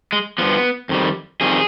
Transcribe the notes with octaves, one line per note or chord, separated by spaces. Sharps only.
G#3
G2 F3 B3
F2 D#3 G3
F2 D#3 G3 G#4